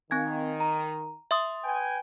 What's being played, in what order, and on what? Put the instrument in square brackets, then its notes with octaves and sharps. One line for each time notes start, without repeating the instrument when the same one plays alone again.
[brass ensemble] D#3 [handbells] C4 G#5 G#6
[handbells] A#5
E5 C6 D#6
[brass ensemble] B4 G5 G#5